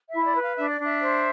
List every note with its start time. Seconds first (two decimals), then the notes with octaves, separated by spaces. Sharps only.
0.09 E4 E5
0.25 D5
0.36 B4
0.42 F5
0.56 D4 E5
0.69 D5
0.79 D4 E5
1.02 C5